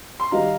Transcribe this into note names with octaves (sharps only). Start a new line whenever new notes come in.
C6
D#3 G3 D#4 G4 F5 A#5